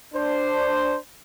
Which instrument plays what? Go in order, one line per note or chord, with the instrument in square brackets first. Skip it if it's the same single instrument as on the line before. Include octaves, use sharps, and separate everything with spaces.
[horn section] D4 C5